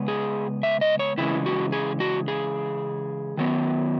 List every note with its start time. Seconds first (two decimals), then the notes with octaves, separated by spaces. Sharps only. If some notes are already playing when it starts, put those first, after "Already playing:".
Already playing: C#3 G#3 B3
0.08 G#4
0.63 E5
0.81 D#5
0.99 C#5
1.18 C#3 E3 G#3 C#4 E4
1.46 F#4
1.72 G#4
2.00 F#4
2.28 G#4
3.37 D#3 F#3 B3